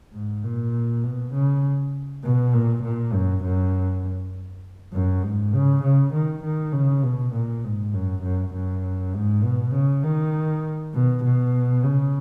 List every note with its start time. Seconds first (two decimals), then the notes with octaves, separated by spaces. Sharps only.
0.13 G#2
0.43 A#2
1.03 B2
1.34 C#3
2.24 B2
2.53 A#2
2.83 A#2
3.13 F#2
3.44 F#2
4.93 F#2
5.23 G#2
5.54 C#3
5.83 C#3
6.13 D#3
6.43 D#3
6.73 C#3
7.03 B2
7.33 A#2
7.64 G#2
7.94 F#2
8.23 F#2
8.54 F#2
9.14 G#2
9.43 B2
9.74 C#3
10.04 D#3
10.94 B2
11.24 B2
11.84 C#3